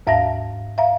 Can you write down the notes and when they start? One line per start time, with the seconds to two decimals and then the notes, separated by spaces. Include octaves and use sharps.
0.07 D#2 G#2 E5 F5 A5 A#6
0.78 E5 F5 A#5